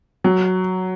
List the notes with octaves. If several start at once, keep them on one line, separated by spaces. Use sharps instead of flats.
F#3